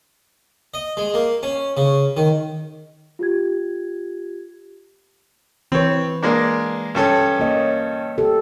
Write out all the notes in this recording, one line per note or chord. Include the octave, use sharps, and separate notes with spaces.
D#5
G#3
A#3
C#4
C#3
D#3
F4 G4 G#6
E3 C4 B4 C#5
G#3 A#3 D4
G2 C#4 A4
A#3 C#5 D#5
G4 A4